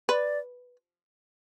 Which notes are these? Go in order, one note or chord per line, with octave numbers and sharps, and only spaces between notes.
B4 D5